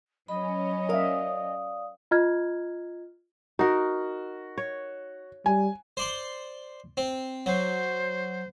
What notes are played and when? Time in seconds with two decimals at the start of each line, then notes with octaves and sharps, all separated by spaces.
0.28 F#3 C#4 D#5 B5
0.89 A#4 D5 E5 F5 D#6
2.11 F4 D#5 A#5 F6 G#6
3.59 D#4 F#4 A#4
4.58 C#5
5.46 G3 G#5
5.97 C5 D5 C6
6.97 C4
7.46 F#3 C5